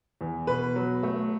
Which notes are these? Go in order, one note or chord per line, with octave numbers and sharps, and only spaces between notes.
E2
B2 B4
F#3
A3